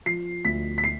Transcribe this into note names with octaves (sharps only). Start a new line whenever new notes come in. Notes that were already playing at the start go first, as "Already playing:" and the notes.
F3 C7
D2 B6
B6
C7